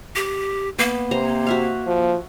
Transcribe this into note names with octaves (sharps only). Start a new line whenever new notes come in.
G4
A#3 B3
C3 C5 A#5
F#4 E5 F5
F3